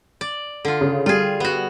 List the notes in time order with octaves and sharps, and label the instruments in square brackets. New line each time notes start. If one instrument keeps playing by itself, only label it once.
[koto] D5
D3 F4
[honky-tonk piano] C#3
[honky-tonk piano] G3 [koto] F4 G#4
[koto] B3 F#4